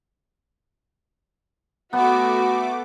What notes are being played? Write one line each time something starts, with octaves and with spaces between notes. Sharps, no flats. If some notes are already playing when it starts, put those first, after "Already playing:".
A3 B3 F#4 E5 D6